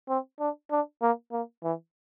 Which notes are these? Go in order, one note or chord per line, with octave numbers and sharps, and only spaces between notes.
C4
D4
D4
A#3
A#3
E3